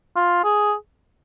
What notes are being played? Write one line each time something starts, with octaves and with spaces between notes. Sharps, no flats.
F4
G#4